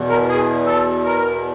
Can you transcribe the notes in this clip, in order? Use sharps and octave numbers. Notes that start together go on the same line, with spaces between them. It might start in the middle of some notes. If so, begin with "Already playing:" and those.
Already playing: E2 B2
A#4
G#4
A4
A#4